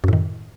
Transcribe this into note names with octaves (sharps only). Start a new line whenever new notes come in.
F#2 A2 D#3